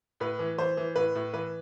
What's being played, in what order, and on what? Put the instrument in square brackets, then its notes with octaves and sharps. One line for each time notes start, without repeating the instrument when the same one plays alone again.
[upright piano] A2 B4
E3
E3 C5
E3
A2 B4
A2
E3 B4